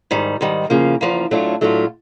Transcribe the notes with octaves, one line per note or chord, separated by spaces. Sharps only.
G#2 D#3 G3
G#2 D#3 G3
E2 C#3 F3 A#3
E2 C#3 F3 A#3
A2 F#3 A3 D4 F4
A2 F#3 A3 D4 F4